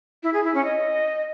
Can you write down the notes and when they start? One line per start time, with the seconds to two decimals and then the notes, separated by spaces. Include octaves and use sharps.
0.23 E4
0.34 G#4
0.44 E4
0.54 C#4
0.65 D#5